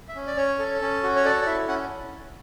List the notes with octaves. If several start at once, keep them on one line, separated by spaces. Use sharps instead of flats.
E5
C#4
D5
C#4 C#5
A4
C#4
F#4
C#5
A4 D5
D5
E4 E5
C#4 F#5